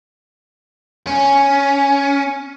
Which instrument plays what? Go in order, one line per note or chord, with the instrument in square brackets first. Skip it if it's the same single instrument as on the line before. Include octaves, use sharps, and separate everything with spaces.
[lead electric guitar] C#4